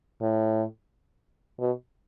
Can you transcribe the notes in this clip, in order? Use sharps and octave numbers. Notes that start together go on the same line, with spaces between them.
A2
B2